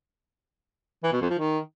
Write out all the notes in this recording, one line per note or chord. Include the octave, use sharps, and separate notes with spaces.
E3
B2
F2
F3
D#3